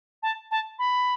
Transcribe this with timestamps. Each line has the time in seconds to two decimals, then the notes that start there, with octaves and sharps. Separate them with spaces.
0.22 A5
0.51 A5
0.78 B5